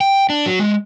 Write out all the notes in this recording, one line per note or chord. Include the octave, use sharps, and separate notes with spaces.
G5
D4
F#3
G#3